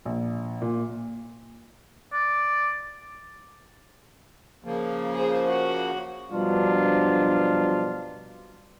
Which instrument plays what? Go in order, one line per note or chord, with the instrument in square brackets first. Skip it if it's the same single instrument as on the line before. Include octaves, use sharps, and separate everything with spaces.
[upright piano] A#1
A#2
[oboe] D5
[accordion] C#3 F3 A#3
[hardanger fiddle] G#4 C5
F#4
[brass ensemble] G2 B2 F3 F#3 D4 F4